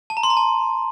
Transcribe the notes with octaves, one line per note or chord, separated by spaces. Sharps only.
A5
A#5
C6
A#5
A5